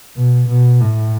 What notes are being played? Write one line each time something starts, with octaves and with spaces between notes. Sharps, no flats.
B2
B2
A2